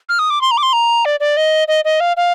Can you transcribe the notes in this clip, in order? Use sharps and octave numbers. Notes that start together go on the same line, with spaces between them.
F6
D#6
D6
C6
A#5
D6
C6
A#5
D5
D5
D#5
D#5
D#5
F5
F5